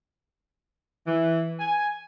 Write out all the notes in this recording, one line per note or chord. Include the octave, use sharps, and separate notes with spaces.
E3
G#5